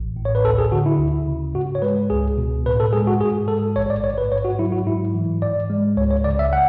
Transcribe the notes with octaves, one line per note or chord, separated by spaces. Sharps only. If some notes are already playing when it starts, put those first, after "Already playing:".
Already playing: A1
A2
C#5
B4
D2 A4
G#4
D3 F#4
E4
D2
C#3
G#2 F#4
C#5
G#3 B4
C#2 G#4
B2
A2 B4
A4
G#3 G#4
F#4
G#2 G#4
G#3 A4
A1 C#5
D5
G#2 C#5
B4
G#2 C#5
F#4
F#3 E4
F#4
G#2 E4
E3
G#2 D5
G#3
C#2 C#5
C#5
C#3 D5
E5
F#5